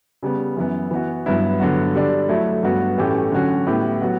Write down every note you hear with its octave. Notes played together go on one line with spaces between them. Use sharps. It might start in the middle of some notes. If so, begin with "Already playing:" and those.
C#3 G3 B3
F#2 E3 B3
E3 B3 F#4
G2 F#3 B3 E4
G2 D3 F#3 B3 F#4
D3 G3 D4
F#3 A3 E4 A4
G2 F#3 B3 F#4
A2 E3 A3 C#4 G4
D3 F#3 C#4 F#4
A2 G3 B3 E4 G4
F#3 B3 F#4